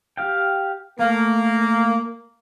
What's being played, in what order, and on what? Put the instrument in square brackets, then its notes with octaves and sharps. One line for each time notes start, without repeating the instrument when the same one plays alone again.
[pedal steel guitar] G4 F5 G5
[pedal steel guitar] A3 [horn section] A#3